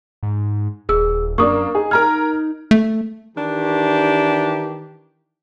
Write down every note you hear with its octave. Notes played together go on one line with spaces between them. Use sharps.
G#2
D#1 G#4 E6
F#2 A#3 D4 C#6 D#6
D#4 G#4
A#4 A#5 F6 G#6
A3
D#3 E3 D4 G4